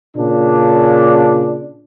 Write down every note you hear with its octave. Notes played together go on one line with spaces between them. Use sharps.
A#2 C#3 D4